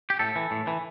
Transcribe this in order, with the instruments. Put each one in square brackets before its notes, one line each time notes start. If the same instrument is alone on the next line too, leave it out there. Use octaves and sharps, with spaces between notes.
[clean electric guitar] G4
A2 A4
E3
A2
E3